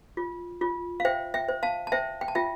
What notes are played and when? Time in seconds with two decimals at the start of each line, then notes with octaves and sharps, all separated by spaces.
0.17 F4
0.61 F4
1.00 F5
1.05 C5 E5 G5
1.34 E5 G5
1.49 C5
1.63 F5 A5
1.87 A5
1.92 C5 E5 G5
2.21 G5
2.28 A5
2.35 F4 E5 G5